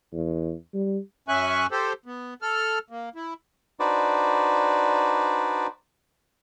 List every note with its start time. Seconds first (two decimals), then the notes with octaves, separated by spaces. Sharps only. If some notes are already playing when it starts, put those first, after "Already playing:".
0.12 E2
0.74 G3
1.28 F#2 C#4 E5 G#5 C#6 F#6
1.71 G4 A4 C5
2.06 B3
2.42 A4 F6
2.90 A#3
3.16 E4
3.80 D4 D#4 F#4 B4 C5 D5